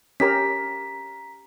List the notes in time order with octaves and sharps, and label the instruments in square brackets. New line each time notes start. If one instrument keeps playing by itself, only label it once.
[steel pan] C#4 G4 A#4 [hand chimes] A#5 B6